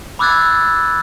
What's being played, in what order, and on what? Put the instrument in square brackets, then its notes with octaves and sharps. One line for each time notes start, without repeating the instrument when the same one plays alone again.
[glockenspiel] B5 D6 E6 F#6 G#6 A6